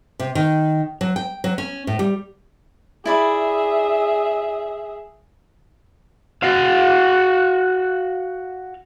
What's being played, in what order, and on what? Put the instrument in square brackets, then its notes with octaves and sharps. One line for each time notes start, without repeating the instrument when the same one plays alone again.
[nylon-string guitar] C3
D#3
F#3
G5
F#3
C#4
A2
G3
[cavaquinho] E4 D5 B5 [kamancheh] G#4 E5
[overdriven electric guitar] F#4 F5